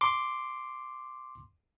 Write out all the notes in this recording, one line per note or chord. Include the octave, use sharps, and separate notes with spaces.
C6 D6